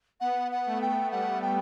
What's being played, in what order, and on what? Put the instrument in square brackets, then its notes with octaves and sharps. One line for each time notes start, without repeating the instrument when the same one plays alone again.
[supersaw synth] B3 [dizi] F#5
[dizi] F#5
[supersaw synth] A3
[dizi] G5
[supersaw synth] G3 [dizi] F#5
[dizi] G5